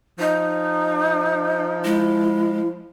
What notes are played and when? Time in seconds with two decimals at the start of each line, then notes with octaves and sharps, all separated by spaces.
0.19 F3 D#4
1.84 G#3 E4